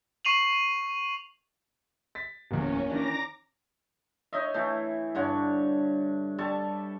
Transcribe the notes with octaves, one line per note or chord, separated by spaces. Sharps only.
C#6 C7 D#7 F7 F#7
A6 B6
D1 E2 A#3 C#4
D#3 E3 D4 A#5 D6 A#6
D#4 C#5 D#5 E5
E3 A3
G2 D3 C#5
G3 A4 A5 C#6